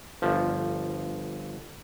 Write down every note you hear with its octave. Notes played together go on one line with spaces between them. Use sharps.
G1 F3